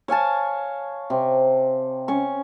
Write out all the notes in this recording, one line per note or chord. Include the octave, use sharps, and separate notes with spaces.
C#5 F5 G#5 A5
C3
C#4 C#6